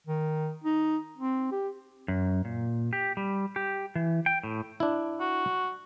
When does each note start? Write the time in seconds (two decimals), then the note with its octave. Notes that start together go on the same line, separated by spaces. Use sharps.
0.07 D#3
0.64 D#4
1.18 C4
1.52 G4
2.08 F#2
2.45 A#2
2.93 G4
3.17 G3
3.56 G4
3.95 E3
4.26 G5
4.43 A2
4.80 D4 E4
5.20 F#4